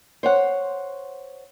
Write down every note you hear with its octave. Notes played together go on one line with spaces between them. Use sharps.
C5 C#5 F#5